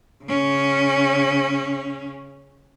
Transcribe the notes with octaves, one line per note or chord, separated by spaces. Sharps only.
C#3 C#4